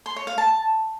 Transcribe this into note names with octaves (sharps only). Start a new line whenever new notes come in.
C6
C#5
F5
A5